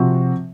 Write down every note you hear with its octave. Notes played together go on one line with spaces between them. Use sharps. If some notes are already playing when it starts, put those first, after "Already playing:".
Already playing: C3 F3 C4 F#4